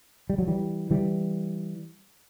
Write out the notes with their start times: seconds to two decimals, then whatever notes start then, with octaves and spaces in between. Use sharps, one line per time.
0.30 G3
0.38 F#3
0.47 E3 G3
0.91 E3 G3